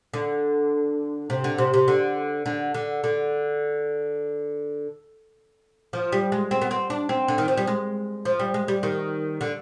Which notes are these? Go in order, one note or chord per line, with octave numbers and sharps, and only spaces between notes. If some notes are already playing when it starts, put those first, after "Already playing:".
D3
C3
D3
C3
C3
D3
D3
D3
D3
F3
G3
G#3
C4
B3
C4
D4
C4
D3
D#3
F3
G3
G#3
F3
G3
G#3
G3
D#3
D3